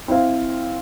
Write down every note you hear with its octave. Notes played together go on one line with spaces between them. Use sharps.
C4 E4 C5 F5